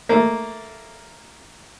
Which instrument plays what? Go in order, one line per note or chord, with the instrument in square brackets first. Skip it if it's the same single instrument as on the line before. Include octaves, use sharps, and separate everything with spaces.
[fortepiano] A3 A#3